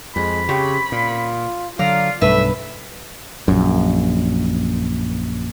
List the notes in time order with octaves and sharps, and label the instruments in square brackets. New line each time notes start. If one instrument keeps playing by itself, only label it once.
[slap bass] F2 [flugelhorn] G#3 [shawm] B5
[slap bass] C#3 [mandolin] C4 C#4 [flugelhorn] G4
[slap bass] A#2 [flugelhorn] F4
[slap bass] D3 F#3 [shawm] F4 [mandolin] D5 A#5 [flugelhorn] F5
[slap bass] B1 G2 [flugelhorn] A3 [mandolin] B4 [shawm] E5
[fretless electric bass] A#1 F#2